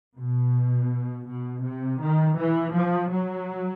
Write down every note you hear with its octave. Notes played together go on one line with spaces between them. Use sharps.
B2
B2
C3
D#3
E3
F3
F#3